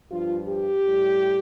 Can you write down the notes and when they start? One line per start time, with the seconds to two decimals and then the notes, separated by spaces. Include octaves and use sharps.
0.11 G2 F3 F4
0.48 G4
0.85 A2 G3